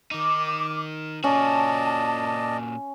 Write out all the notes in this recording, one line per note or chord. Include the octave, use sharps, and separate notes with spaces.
D#3 D#4 D6
A#2 C#4 F#4 D5 D#5 A5